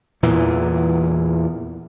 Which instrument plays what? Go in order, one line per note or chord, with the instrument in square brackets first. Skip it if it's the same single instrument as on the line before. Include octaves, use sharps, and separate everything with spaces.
[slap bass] E2 A#2 E3